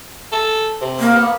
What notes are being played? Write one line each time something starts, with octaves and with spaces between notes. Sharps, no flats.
A4
C3
A#3
B3